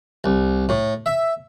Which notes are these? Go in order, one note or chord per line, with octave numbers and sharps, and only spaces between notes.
C2
A2
E5